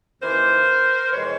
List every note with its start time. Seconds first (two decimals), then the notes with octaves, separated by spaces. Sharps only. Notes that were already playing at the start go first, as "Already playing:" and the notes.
0.21 D#2 C#3 E3 A#4 C5
1.11 F2 C3 E3 G#3 B4 C#5